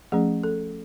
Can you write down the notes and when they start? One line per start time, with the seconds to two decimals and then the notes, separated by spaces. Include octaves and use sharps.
0.12 F3 A3 C#4 G#4
0.44 A4